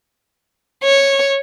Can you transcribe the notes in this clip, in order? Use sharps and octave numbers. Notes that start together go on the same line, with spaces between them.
C#5